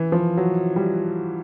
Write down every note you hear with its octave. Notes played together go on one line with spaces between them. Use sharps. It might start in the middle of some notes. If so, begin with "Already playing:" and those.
Already playing: E3
F3
F#3
G3